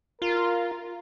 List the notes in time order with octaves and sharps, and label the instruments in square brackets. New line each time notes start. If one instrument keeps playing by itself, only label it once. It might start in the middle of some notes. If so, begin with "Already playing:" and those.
[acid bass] F4 [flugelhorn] A#4